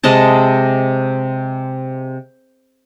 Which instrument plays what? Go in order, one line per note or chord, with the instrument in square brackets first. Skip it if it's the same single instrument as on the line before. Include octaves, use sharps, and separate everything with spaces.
[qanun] C3 G#3 D#5 A5